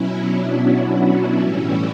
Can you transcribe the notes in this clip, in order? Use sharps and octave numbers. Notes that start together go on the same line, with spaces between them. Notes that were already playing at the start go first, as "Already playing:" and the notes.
Already playing: B2 F#3 C#4 E4
B3 D4
D4 F#4
C#4 E4
A2 E3 G3